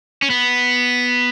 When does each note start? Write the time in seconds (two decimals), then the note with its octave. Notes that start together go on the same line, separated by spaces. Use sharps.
0.22 C#4
0.30 B3